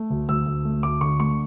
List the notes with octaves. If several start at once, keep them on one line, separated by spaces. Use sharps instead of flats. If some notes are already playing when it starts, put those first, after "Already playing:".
Already playing: A3
D2
D2 E6
D2
A3
D2 D6
D3 C#6
A3 C#6